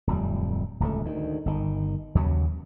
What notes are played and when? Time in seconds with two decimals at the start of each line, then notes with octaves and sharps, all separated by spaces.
0.07 D1 F2 G3
0.80 D1 C#2 G#3 A3
1.05 D2 D#3
1.46 G1 D#3
2.15 D#2 C#3 F#3